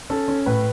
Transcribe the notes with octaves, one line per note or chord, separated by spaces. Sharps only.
C#4 A4
C#4
A2 B4